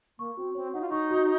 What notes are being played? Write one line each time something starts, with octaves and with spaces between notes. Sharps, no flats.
A#3 C#6
C4 F#4
C4 C#5
D#4 F#5
F4
D#4 C#6
F#4